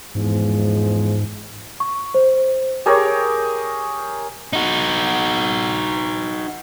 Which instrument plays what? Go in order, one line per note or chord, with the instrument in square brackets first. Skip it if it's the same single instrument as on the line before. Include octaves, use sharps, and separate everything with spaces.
[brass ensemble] E2 F3 G#3 [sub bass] G#2
[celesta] C#6
C5
[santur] G4 G#4 A#4 C#5
[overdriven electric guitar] D#4 F#4